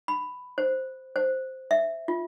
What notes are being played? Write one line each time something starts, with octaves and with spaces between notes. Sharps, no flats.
B5
C5
C5
E5
F4